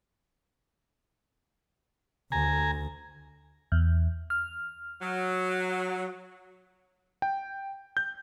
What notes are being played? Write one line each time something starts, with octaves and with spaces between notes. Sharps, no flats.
D2 G#5 A#5
E2
F6
F#3
G5
G6